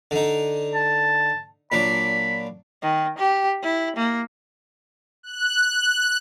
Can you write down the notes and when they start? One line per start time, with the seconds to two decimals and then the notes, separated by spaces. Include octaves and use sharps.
0.11 D3 D#4
0.75 A5
1.72 A#2 F#3 D4 B5
2.83 D#3
3.18 G4
3.63 E4
3.96 A#3
5.23 F#6